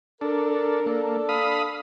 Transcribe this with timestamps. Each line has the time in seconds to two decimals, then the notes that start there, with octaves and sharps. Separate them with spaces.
0.21 D4 A4 A#4
0.86 A#3 D4 A4
1.29 F5 B5 D#6